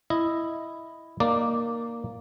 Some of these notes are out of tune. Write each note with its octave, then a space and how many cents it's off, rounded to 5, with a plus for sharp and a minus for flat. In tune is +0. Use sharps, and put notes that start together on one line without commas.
E4 +0 D#5 +0
A#3 +0 D#4 -20 D5 +0